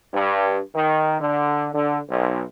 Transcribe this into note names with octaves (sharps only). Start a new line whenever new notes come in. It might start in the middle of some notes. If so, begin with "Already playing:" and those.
G2
D#3
D3
D3
B1